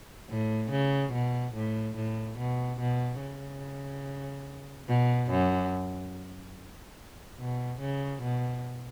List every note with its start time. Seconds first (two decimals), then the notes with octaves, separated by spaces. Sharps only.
0.29 A2
0.71 C#3
1.13 B2
1.55 A2
1.96 A2
2.39 B2
2.80 B2
3.22 C#3
4.88 B2
5.31 F#2
7.39 B2
7.81 C#3
8.23 B2